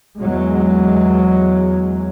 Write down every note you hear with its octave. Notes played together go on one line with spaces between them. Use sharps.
E2 F#3 G#3